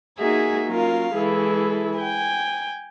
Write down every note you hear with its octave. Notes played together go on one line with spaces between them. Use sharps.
A#3 D#4 F#4 G#4 E5 G#5
F#3 A#3 C#4 F4 A#4 F5
E3 G#3 E4 G#4 A4
G5 G#5